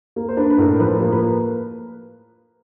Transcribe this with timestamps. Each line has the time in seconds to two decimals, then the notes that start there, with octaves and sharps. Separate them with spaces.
0.16 A#3
0.29 C5
0.37 D4 B4
0.50 B4
0.58 A2 A#4
0.73 A#4
0.80 F3 B4
0.96 B4
1.01 A#3
1.12 B4